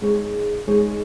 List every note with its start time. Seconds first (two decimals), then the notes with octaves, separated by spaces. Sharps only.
0.01 G#3 D#4 G#4 C#5
0.67 G#3 D#4 G#4 C#5